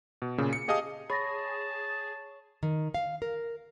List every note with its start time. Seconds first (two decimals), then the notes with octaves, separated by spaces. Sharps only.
0.22 B2
0.38 A#2 C#3
0.53 C#7
0.68 G4 G#4 D#5 F5 A5 D#6
1.10 G#4 C#5 A5 B5 C#6 A6 A#6
2.63 D#3
2.94 F5
3.22 A#4